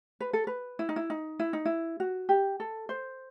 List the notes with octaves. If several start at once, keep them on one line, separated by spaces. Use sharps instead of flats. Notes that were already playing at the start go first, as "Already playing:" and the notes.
B4
A4
B4
E4
D#4
E4
D#4
E4
D#4
E4
F#4
G4
A4
C5